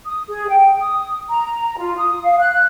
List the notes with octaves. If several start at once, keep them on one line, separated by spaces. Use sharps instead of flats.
D#6
G#4
G5
D#6
A#5
F4
D#6
F5
F#6